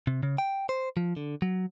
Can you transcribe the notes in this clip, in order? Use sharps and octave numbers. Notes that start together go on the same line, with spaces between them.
C3
C#3
G5
C5
F3
D3
F#3